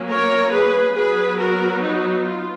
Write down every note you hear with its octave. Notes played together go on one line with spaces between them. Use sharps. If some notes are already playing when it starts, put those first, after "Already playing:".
Already playing: F#3 A#3 C#4
A#4 C#5
G#4 B4
F#3 B3 G#4 B4
F#4 A#4
D#4 F#4
F4